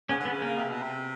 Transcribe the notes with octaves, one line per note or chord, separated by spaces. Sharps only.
C#3 B3 C#4
D3
B3
C#3
A#3
C3
B2
C3